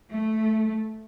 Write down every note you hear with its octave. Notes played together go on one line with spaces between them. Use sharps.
A3